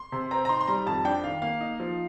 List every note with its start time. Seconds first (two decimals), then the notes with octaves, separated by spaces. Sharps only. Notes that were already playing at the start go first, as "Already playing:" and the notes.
Already playing: C6
0.12 C3
0.31 C4 A#5
0.45 A#5
0.49 D#4 C6
0.61 C6
0.68 G3 A#5
0.87 F2 A5
1.05 D4 G5
1.24 D#3 F5
1.42 A#3 F5
1.61 D#4
1.80 F3